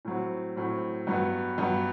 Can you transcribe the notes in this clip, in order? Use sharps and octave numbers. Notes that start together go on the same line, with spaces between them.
A2 F#3 C4
A2 F#3 C4
G2 F#3 B3
G2 F#3 B3